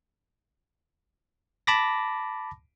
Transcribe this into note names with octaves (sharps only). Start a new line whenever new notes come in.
A5 B5 D6 A#6